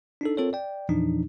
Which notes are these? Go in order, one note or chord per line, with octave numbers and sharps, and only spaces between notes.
D4 D#4 A4
C4 F4 A4 A#4 C#5
D5 G5
E2 A#2 E3 F3 D4 D#4